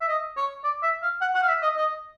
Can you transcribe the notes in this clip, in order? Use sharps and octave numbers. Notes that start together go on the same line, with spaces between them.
E5
D#5
C#5
D5
E5
F5
F#5
F#5
F5
E5
D#5
D#5